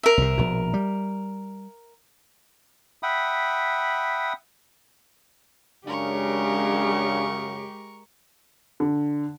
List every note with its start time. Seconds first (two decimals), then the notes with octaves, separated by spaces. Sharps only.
0.03 A#4 E5
0.17 C2 C3
0.37 A#1 B2
0.74 G3
3.03 E5 F#5 G5 B5 D#6
5.87 F#2 C#3 G#3 D4 G4 A#4 C#6
8.80 D3